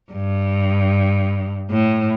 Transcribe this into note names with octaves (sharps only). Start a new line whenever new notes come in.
G2
A2